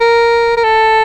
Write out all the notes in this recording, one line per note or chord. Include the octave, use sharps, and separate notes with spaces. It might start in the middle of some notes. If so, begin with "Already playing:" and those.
A#4
A#4
A4